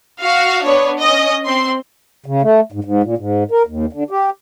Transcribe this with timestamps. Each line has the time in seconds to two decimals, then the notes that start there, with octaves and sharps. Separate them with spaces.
0.22 F#4 F5
0.63 B3 D4 C#5
1.00 C#4 D#5
1.45 C4 C6
2.26 C#3
2.42 A3
2.72 G#2
2.84 G#2
3.03 A#2
3.18 G#2
3.51 A#4
3.67 D#2
3.93 D3
4.11 G4